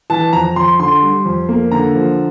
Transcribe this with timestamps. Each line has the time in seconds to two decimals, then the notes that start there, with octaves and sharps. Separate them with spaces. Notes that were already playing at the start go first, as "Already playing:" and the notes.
0.10 E3 A5
0.33 F2 A#5
0.56 F2 C6
0.80 D3 C6
1.02 G3
1.25 F2
1.49 A#3
1.71 D3 A#5
1.95 F3